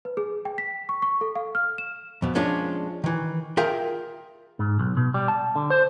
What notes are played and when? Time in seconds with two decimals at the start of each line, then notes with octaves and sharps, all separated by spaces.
0.05 B4
0.17 G#4
0.45 G5
0.58 B6
0.89 C#6
1.02 C#6
1.21 A4
1.36 F5
1.55 F6
1.78 E7
2.22 F2 B2
2.35 F3 G#3 C#4 D4 F4
3.04 D#3 E3
3.57 F4 G#4 A#4 E5 F5 G5
4.59 G#2
4.79 B1
4.97 B2
5.14 G3
5.28 A5
5.56 D3
5.70 C5